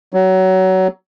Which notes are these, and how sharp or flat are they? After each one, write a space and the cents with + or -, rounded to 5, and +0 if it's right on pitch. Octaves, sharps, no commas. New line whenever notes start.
F#3 +25